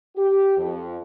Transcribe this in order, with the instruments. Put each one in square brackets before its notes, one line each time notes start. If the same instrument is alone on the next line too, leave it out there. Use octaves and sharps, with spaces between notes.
[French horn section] G4
F2